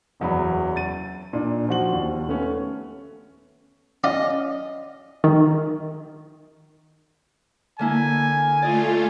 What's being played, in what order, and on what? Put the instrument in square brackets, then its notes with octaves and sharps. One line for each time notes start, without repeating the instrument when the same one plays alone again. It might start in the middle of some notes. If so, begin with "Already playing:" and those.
[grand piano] F#1 E2 F#3 B5
A6 D#7
A#2 D4 D#4
F3 F#4 F#7
D#2
A3 B3 C#4
[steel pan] C#4 [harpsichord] F4 D5 [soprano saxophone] D#5
[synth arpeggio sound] D#3
[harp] D3 A#3 E4 [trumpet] G#5
[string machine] A3 F4 [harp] D5 D#5